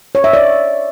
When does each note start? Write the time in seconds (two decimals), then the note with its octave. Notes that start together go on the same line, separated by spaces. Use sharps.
0.15 C#5
0.24 E5
0.33 D5